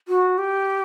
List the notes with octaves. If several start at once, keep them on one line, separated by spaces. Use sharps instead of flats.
F#4
G4